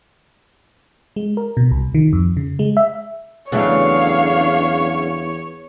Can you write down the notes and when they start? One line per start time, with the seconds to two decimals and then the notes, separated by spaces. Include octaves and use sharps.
1.16 G#3
1.37 A#4
1.57 B2
1.71 C2
1.95 D#3
2.13 F2
2.37 C#3
2.59 G#3
2.77 E5
3.52 E2 C#3 F#3 A3 D4 C#5 F5